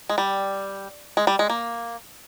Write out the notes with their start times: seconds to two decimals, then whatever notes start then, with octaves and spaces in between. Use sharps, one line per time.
0.09 G#3
0.18 G3
1.17 G#3
1.27 G3
1.39 G#3
1.50 A#3